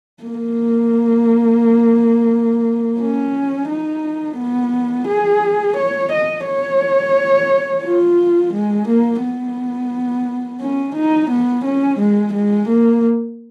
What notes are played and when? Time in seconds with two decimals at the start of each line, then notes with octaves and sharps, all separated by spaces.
0.23 A#3
3.00 C#4
3.69 D#4
4.38 B3
5.08 G#4
5.77 C#5
6.12 D#5
6.46 C#5
7.84 F4
8.53 G#3
8.88 A#3
9.23 B3
10.61 C#4
10.95 D#4
11.30 B3
11.65 C#4
11.99 G#3
12.33 G#3
12.68 A#3